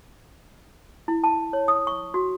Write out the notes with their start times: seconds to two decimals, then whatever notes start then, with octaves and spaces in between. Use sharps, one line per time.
1.08 E4
1.24 A5
1.53 C#5
1.68 D#6
1.87 C#6
2.14 F#4